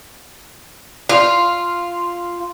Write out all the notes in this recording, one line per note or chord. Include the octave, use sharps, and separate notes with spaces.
F4